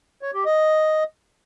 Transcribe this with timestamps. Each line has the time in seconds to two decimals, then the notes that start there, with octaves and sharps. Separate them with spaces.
0.22 C#5
0.34 G4
0.45 D#5